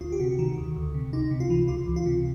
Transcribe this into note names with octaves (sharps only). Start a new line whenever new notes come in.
D2 F4
G4
C3 F#4
D#3 F#4
D2
D2
C3
C#2 D#4
C3
F4
E3
C#2 F4
C#2
F4
C3